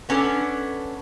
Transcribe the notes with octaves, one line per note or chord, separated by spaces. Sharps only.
B3 C#4 D4 A4